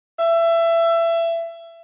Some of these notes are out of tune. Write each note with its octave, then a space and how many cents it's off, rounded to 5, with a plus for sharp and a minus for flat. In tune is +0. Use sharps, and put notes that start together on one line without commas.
E5 +25